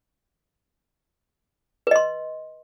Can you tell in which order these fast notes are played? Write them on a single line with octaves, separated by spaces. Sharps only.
B4 D#5 C6